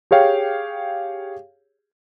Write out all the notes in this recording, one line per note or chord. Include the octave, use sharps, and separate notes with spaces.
G4 G#4 C#5 F5 G5